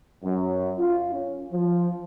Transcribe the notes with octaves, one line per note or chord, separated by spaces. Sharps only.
F#2
F4
C#4
F3